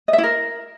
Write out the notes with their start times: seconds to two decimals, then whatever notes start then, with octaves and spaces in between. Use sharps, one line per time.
0.08 D#5
0.13 E5
0.18 E4
0.23 A#4